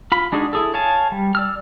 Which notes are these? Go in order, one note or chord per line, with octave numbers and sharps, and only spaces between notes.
F4 B5
G#3 D4 D#4 F#4 G#4
E4 G#4 A4
C#5 F5 G#5 A5
G3
D5 E6 F6